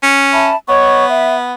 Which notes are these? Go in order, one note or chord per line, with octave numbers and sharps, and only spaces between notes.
C#4
E5 A5 B5
B3 C#5 D#5 C#6
E5